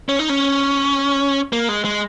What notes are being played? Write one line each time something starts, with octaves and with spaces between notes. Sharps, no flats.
C#4
D#4
C#4
A#3
G#3
G#3